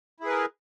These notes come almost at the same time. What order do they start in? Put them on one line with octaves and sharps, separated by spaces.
E4 G#4 B4 A#4